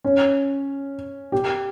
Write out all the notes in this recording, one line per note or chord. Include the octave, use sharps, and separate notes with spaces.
C#4
G4